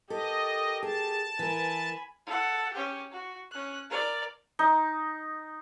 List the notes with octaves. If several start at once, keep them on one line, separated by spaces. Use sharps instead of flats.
G4 A4 A#4 D#5
G#4 A5
E3 A#4 G#5 B5
A4 F#5
C#4 G4
F#4
C#4 F#6
A#4 D5
D#4